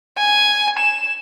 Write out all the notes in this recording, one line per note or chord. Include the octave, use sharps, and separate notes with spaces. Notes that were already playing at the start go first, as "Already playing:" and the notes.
G#5
E7